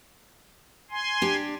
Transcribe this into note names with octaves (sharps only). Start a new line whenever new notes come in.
G#5 C6
D4 G4